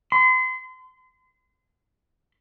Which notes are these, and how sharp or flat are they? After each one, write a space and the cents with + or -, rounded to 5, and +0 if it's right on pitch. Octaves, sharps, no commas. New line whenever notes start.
C6 -35